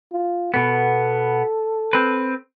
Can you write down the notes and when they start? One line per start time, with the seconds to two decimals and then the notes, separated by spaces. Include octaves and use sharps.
0.12 F4
0.54 B2 B3 A4
1.93 C4 B4